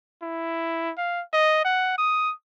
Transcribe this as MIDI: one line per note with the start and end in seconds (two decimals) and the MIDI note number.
0.23 0.92 64
0.98 1.22 77
1.33 1.61 75
1.65 1.97 78
1.98 2.33 87